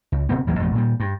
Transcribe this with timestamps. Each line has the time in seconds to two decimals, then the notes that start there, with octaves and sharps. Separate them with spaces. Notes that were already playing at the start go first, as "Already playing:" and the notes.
0.12 C#2
0.29 D1 C3 B3 C4
0.47 A1 D#2 F#3 A#3
0.58 A1 F2 B2 A3
0.75 A#2 G3
1.00 G2